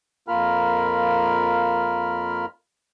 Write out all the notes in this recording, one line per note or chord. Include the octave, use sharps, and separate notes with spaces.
F2 A#3 F4 A#4 B5 F6